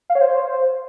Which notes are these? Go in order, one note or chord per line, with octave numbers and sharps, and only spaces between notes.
F5
C#5
C5